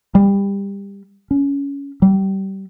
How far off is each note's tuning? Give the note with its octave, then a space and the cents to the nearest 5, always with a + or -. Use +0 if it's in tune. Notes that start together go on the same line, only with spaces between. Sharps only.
G3 +20
C#4 +20
G3 -25